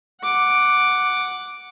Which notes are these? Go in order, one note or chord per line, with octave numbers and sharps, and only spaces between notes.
F#5 D6